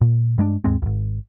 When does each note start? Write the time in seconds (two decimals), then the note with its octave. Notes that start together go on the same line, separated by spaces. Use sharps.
0.01 A#2
0.38 G2 G#3 A3 D4
0.64 D#2 G#2 G#3 C4
0.82 G#1 C#2